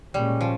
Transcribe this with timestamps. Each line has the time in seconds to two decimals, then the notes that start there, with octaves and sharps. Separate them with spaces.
0.14 A#2 G3 G#3 C#4
0.41 F3